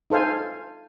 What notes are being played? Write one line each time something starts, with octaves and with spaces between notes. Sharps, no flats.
D#4 A4 C5 F5 G#5